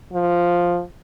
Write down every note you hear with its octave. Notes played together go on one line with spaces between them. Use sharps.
F3